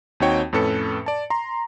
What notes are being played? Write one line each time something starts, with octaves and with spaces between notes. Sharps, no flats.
D#2 C4 D#4 F#4 C#5 G5
F2 A2 C#4 A4 B4 C#7
D5 A5
A#5 C6